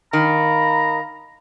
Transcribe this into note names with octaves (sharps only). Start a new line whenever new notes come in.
D#3 F5 A#5 B5